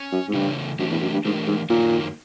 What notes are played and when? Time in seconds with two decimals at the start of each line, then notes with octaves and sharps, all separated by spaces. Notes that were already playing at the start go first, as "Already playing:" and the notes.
Already playing: C#4
0.12 F#2
0.28 G#2
0.34 G2 C#3 E3 A3 C#4
0.79 F#2 E3 A3 D4 G4 A#4
0.91 E2
1.02 F#2
1.13 G2
1.25 G#2 E3 A3 D4 G4 A#4
1.47 G#2
1.70 F#2 A#2 D#3 F#3 A#3